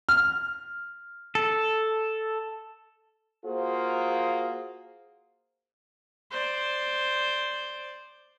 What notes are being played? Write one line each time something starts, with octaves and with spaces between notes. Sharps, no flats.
F6
A4
A#3 F4 F#4 G#4 C5
C5 D5